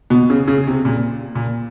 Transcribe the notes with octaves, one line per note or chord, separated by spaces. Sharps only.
B2
C#3
C#3
C3
A#2
A#2